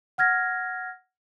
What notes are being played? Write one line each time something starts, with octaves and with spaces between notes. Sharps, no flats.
F#5 F6 G#6 A#6